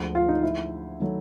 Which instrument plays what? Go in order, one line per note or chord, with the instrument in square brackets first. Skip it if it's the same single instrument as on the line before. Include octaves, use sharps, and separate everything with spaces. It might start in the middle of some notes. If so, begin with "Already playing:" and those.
Already playing: [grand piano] D2 D3 F3 G#3
[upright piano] F4
D#4
E4
[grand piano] D#3 F#3 A3